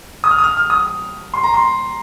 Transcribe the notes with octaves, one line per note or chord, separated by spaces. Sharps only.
D#6
F6
D#6
F6
F6
D#6
C6
A#5
C6